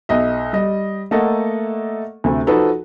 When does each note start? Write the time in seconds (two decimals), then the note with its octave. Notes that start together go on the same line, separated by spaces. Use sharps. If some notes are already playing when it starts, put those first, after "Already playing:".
0.09 B1 D#5 E5
0.53 G3 D#5
1.11 A3 A#3 A4 D#5 F#5
2.24 D2 C3 A3
2.47 F3 D#4 F#4 A4 B4